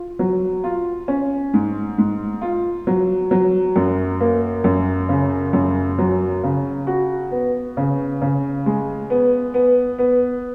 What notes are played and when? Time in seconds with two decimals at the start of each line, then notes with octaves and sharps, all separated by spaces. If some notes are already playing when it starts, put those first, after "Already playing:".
Already playing: F4
0.19 F#3
0.64 F4
1.08 C#4
1.54 G#2
1.98 G#2
2.42 F4
2.87 F#3
3.31 F#3
3.76 F#2
4.20 A#3
4.64 F#2
5.09 C#3
5.53 F#2
5.98 F#3
6.44 C#3
6.87 F#4
7.31 B3
7.77 C#3
8.22 C#3
8.66 G#3
9.10 B3
9.54 B3
9.99 B3